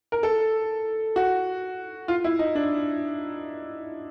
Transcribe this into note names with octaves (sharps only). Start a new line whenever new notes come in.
A#4
A4
F#4
F4
E4
D#4
D4